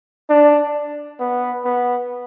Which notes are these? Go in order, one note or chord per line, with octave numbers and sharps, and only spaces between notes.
D4
B3
B3